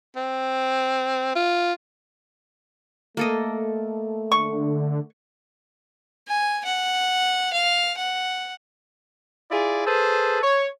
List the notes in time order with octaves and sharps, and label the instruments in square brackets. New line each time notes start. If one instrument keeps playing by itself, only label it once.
[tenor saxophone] C4
F4
[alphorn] A3 [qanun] A#3 A4 D#5
[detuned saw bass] D3 [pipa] C#6
[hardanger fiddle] G#5
F#5
F5
F#5
[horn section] E4 F4 G#4 D5
G#4 A4 B4 C5
C#5